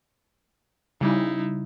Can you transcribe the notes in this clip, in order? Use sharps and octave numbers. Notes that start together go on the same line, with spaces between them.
C#3 G3 D#4 E4